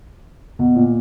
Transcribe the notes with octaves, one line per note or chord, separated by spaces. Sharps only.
B2
A#2